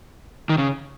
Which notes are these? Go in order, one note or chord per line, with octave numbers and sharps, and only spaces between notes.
D#3
C#3